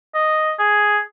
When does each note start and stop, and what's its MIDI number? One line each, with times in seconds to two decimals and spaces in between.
0.14 0.53 75
0.59 1.00 68